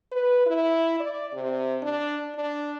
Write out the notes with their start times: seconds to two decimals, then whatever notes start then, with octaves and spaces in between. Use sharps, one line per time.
0.12 B4
0.46 E4
1.00 D5
1.33 C3
1.82 D4
2.36 D4